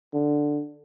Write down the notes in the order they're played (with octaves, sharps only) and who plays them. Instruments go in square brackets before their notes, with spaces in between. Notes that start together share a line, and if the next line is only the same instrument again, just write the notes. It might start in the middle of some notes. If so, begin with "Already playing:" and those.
[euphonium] D3